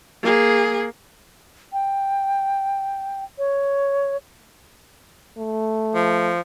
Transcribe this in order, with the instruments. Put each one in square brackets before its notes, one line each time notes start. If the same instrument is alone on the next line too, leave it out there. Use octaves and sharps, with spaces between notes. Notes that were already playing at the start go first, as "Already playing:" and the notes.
[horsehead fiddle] A#3 G#4
[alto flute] G5
C#5
[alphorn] A3
[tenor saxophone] F3